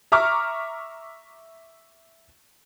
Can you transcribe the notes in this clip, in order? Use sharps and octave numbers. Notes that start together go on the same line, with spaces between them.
E5 A#5 C#6 D6 F6